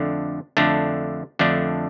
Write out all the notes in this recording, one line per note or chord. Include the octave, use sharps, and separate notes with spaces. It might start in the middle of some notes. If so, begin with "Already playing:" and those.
Already playing: F2 D3 A3 D4
F2 D3 A3 D4
F2 D3 A3 D4